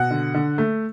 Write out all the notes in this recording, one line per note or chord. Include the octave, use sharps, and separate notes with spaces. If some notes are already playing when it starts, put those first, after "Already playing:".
Already playing: B2 F#5
D3
D3
A3